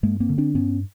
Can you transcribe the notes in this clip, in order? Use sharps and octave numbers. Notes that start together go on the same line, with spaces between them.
G2 G#3 A#3
A#3 C4
D3
C4 D4
G2 B3 C#4